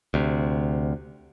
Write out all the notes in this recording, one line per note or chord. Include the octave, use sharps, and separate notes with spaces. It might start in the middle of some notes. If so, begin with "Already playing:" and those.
D2 C3